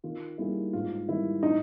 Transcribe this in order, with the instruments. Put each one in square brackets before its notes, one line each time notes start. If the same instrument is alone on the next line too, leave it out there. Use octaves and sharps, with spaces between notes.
[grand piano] D#3 [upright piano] F4
[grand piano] G3 A#3 D#4 G#4 [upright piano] E4
[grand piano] G#2 [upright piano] F4
[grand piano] D#3 G3 [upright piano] E4
[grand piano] A2 [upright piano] D#4